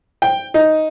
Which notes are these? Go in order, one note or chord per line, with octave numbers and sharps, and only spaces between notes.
G5
D#4